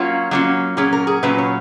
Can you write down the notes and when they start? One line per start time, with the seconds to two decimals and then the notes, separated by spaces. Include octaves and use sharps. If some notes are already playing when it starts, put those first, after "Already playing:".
Already playing: F#3 A#3 C#4 F4 F#4
0.31 F#3 A#3 C#4 F4
0.77 A#2 F#3 C#4 G#4
0.93 A#4
1.07 G#4
1.23 A#2 F#3 C#4 B4
1.38 C#5